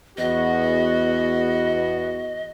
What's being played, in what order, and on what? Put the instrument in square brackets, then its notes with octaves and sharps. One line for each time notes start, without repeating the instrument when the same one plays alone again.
[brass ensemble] E2 B3 F#4 [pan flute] D#5